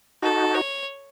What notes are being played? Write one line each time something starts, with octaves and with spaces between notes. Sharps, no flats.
D#4 F#4 A4
C#5